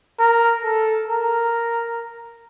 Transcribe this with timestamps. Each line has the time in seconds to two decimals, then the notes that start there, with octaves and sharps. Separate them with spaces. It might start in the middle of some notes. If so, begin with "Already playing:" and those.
0.19 A#4
0.64 A4
1.09 A#4